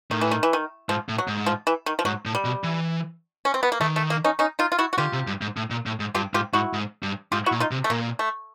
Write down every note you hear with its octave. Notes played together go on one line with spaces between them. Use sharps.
A2 D#3
E3
D#3
E3
D#3
G#2 F3
A2
F#3
G#2
F3
E3
D#3
F3
G#2 F#3
A2
G3
B2
E3
C#4
C4
B3
A#3
D#3 A3
A3
A#3
C#4 D#4
C#4 D#4
D#4 F4
F4
E4 F#4
F#4
D3 F4 G4
C3
G2
G#2
A2
A#2
A2
G#2
G2 F4 G4
G#2 F4 G4
G#2 E4 F#4
G#2
G2
G#2 F4 G4
E4 F#4
A#2
D#4 F4
C3
A3
A#2 A#3
A3